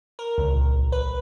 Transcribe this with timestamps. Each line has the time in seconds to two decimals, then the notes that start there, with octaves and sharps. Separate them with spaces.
0.19 A#4
0.38 C#2
0.52 A#1
0.92 B4